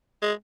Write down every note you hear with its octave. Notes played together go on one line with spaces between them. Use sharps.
G#3